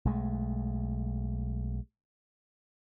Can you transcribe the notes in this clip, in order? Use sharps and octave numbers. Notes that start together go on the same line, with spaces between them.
B1 G#3 A3